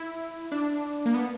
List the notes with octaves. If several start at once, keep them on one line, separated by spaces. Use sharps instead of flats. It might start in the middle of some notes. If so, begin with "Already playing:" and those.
Already playing: E4
D4
A#3
B3